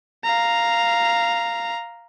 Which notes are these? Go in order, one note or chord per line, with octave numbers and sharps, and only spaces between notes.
F5 A#5